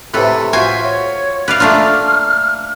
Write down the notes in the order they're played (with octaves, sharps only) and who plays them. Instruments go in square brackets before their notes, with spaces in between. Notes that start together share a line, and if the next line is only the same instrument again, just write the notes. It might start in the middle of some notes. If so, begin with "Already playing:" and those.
[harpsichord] A2 C3 E3 [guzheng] A4 B4
[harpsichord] F4 F#4 C5 [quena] E5 [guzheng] G#5
[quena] C#5
[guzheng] B4 D5 F5 [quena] F6
[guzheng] A3 D4 F4 [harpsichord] A#3